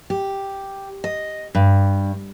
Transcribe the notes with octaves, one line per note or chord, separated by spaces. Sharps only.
G4
D#5
G2